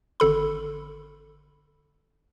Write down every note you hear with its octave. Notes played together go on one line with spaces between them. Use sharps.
G#1 D3 A4 B5